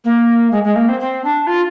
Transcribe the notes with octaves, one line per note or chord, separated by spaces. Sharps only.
A#3
G#3
G#3
A#3
C4
C4
D4
F4